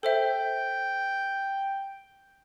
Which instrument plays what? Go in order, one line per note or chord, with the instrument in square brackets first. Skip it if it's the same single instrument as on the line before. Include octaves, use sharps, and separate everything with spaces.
[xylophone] A4 C5 E5 [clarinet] G5